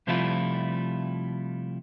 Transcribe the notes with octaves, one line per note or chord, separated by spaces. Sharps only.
C3 F3 G3 A3 E4 F4